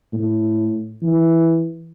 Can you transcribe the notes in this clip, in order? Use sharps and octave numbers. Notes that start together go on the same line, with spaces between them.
A2
E3